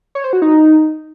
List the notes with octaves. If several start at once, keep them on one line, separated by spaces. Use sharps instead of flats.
C#5
C5
F#4
D#4